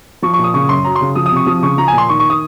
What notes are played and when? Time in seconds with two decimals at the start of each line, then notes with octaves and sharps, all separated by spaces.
0.22 F3 C#6
0.34 A#2 C#6
0.44 D#6
0.54 C#3 C#6
0.69 F#2 C6
0.84 F#3 A#5
0.96 C6
1.01 C#3
1.15 F3 D#6
1.26 C3 D#6
1.36 C#6
1.46 F3 D#6
1.62 C#3 C#6
1.77 F3 A#5
1.88 A#2 G#5
1.98 C6
2.08 D#3 C#6
2.20 C#6
2.30 D#6